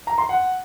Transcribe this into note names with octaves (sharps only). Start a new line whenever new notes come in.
A#5
C6
F#5